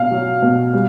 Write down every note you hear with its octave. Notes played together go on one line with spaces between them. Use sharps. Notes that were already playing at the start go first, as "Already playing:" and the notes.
Already playing: B2 F5
F#3
B2
G3